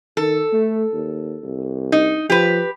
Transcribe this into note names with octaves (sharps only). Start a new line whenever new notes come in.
D#3 A4
A3
D#2
C2
D#4
F3 G4 B4